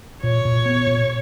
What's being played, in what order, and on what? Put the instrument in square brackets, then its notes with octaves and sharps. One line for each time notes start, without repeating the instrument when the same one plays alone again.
[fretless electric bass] A#2 [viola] C#5
[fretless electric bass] A#2
B3
A#2